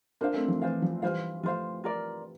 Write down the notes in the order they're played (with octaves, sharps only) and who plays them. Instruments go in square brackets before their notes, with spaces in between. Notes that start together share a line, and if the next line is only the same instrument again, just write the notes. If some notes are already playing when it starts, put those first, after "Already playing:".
[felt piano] A#3 D4 [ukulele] F4 C5 F5
[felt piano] A3 C4
F3
[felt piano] E3 [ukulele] F4 C5 F5
[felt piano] F3
[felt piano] E3 G3 [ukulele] F4 C5 F5
[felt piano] F3 A3 [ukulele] F4 C5 F5
[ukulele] F4 A#4 D5